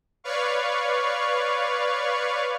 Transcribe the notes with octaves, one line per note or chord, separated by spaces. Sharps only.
B4 C#5 D5 F5 C#6